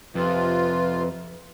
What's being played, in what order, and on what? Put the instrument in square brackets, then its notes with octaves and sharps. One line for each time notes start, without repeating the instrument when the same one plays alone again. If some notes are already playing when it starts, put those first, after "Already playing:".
[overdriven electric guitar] F2 [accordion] C3 F4 [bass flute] B4